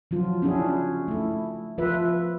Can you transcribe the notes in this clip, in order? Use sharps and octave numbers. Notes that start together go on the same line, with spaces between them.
F3 F#3 F4
C#4 D4 E4 F#4 G#4
A3 E4
F3 F4 B4 E5